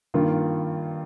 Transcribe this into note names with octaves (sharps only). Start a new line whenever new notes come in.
G2 D#3 A#3 F4